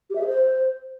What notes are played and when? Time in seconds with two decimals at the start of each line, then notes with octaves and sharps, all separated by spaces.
0.10 G4
0.15 E5
0.21 G#4
0.27 C5